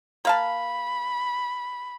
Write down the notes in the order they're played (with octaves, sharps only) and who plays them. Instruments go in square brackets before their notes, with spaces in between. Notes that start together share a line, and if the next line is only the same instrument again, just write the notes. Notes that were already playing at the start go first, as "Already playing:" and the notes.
[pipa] A#3 F5 A5 [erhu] B5